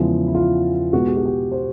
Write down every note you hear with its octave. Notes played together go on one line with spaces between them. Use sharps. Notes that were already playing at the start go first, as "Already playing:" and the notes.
Already playing: E2 C#3 F3 G#3 E4
E4
F4
B2 G#3 F#4
G4
F#4
G4
C5